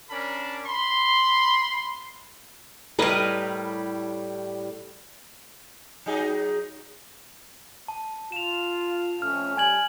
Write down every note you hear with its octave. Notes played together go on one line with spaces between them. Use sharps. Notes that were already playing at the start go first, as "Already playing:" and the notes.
C#4 D4 A#4 A5 B5
B5 C6
A2 G3 A#4 B4 D#5
F#3 D#4 G#4
A5
F4 E7 F7
F2 A3 C#4 F6
G3 G#5 G#6 F#7